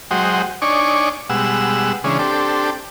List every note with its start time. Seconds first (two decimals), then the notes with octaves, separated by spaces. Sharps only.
0.11 F#3 G#3 F#4 C5 D#5 G5
0.62 D4 D#4 C#5 D5 G#5 C#6
1.30 B2 G3 G#3 F#5 E6
2.04 C#3 E3 G#3 C#4 D4
2.19 C4 D4 G4 A4